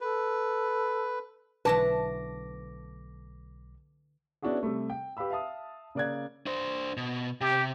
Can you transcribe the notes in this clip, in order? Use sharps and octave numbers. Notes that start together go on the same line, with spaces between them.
A4 B4
B1 D3 E3 A3 B4 A5 D6 A#6
B3 C#4 D4 E4 F#4 G#4
C3 G3 A3
G5
G4 B4 F5 B5 E6
E5 F5 A5 D#6
C#3 A#3 D5 F#6 G#6
D4 C5
B2
C3 G4